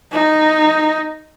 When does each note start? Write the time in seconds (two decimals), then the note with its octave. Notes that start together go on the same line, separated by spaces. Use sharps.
0.12 D#4